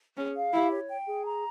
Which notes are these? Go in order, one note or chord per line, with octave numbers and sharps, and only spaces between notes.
C#4 G#4
F5
E4 G4
C#5
G5
G#4
A#5